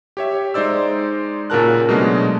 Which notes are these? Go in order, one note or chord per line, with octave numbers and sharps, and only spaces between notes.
G4 C#5 E5
G#3 D#4 C5 D5 E6
A#2 C#3 F#4 A#4 A5 F#6
B2 F#3 G#3 A3 D4 F#4